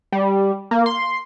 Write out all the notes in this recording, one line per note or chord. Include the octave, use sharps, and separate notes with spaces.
G3
A#3
C6